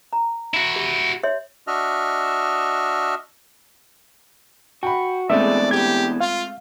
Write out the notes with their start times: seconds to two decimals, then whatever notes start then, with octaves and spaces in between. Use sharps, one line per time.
0.13 A#5
0.54 E4 F#4
0.76 G4
1.23 C#5 E5 C6
1.67 D4 F#4 D#5 E5 F6
4.83 F#4 G5 B5
5.30 E3 G#3 A3 B3 C4 D4 D5 E5
5.71 G4 G#6
6.21 F4 F5